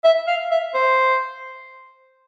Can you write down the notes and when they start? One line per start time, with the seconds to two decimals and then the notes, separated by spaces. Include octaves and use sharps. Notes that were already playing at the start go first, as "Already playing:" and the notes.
0.04 E5
0.27 F5
0.51 E5
0.74 C5